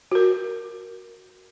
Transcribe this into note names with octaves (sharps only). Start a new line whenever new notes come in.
F#4 A#4